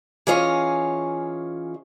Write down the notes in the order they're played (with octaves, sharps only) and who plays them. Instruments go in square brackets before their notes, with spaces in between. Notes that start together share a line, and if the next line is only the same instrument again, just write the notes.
[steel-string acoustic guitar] E3 C#4 F4 G#4 C#5 D#5